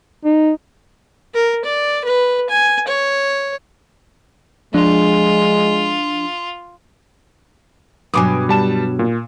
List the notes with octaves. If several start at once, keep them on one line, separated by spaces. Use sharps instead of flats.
D#4
A#4
D5
B4
G#5
C#5
F3 G#3 D4 F4
G2 B2 F#3 G#5 D6 D#6
G3 A5 E7
A#2